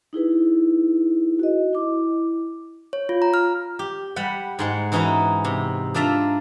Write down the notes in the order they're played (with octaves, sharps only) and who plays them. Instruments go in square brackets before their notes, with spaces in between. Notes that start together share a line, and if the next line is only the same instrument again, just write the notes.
[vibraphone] D#4 E4 G#4 B4
F#4 D#5
E4 D6
[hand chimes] C#5
F4
A#5
F6
[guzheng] G4
G3 F#5 B5
G#2 G#3 F#5
E3 C#4 D#4 F#4 B4 A#5
C3
D4 F4 D5 E5 A#5